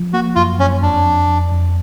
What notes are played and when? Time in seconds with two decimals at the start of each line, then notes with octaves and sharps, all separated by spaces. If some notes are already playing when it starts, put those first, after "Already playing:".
Already playing: F3
0.13 A#3 F#4
0.35 F#2 F4
0.59 F#2 C#4
0.82 F2 D4
1.05 F2
1.28 F2
1.52 F2